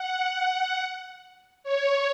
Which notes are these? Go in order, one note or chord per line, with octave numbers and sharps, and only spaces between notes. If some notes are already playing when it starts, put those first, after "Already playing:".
Already playing: F#5
F#5
C#5